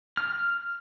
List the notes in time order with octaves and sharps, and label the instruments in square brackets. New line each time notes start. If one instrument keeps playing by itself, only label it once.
[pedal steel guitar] F6